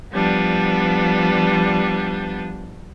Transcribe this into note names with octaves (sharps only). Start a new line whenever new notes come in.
F3 G3 B3 D4